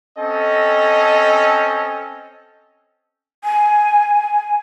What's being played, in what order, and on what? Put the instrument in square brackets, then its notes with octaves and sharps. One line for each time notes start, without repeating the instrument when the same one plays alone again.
[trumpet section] C4 C#4 A4 D#5
[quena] G#5